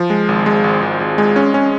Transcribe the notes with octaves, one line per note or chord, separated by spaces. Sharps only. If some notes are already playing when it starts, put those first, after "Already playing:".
Already playing: F3
G#3
G#1
G#3
G#1
G#1
G#1
G#3
C#4
C#4